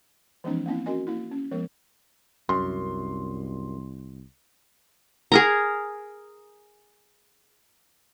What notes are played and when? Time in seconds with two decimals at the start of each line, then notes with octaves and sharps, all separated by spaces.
0.44 E3 F3 G#3 B3 C#4 D#4
0.66 A#3 C4 D4 E4
0.86 C#4 F#4 A#4 D#5 G#5
1.07 A#3 E4
1.31 C#4
1.51 F3 G#3 B3 A#4
2.49 C2 F#2 C6
5.32 G#4 A#4 A#5